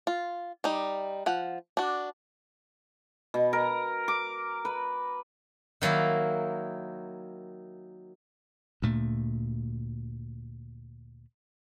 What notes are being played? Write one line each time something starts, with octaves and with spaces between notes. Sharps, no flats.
F4
G3 D#4
F3 F#5
D4 F#4
B2
A#4
D6
B4
D#3 F#3 A#3 E4
D2 A#2 A3